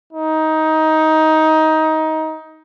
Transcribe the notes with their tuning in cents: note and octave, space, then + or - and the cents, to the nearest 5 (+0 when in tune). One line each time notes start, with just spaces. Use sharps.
D#4 +15